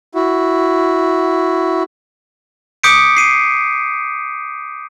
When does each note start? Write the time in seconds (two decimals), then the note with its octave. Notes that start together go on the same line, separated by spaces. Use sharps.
0.15 E4 F#4
2.84 D6 D#6 G6 B6 C#7 D7
3.17 C7 D#7